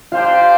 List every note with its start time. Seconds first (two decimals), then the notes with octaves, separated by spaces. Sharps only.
0.12 D4 F4 G4 C5 F5 G5